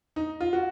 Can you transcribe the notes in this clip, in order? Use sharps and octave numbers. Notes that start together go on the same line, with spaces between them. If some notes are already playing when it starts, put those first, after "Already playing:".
D#4
F4
F#4